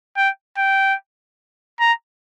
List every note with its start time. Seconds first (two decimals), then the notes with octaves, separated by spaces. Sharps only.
0.17 G5
0.58 G5
1.80 A#5